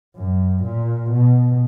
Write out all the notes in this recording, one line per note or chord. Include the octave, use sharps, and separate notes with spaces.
F#2
A#2
B2